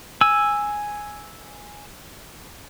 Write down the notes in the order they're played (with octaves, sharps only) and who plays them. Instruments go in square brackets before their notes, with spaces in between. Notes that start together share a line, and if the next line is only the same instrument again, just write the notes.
[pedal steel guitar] G#5 E6